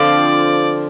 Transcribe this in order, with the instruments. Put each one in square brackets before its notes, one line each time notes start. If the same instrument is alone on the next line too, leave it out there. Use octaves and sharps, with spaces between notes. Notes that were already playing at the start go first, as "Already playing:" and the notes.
Already playing: [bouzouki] D3 F3 C4 [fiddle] D5